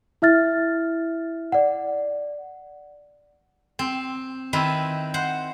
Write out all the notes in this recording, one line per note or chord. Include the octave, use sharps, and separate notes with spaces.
E4 E5 F6 A6
D5 F#5
C4
D#3 C4 E4 B4
C5 F#5